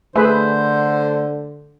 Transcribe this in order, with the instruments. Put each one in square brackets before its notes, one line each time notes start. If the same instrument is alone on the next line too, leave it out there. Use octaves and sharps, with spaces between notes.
[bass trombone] D3 [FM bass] A3 [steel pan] G#4 B4 E5 [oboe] C5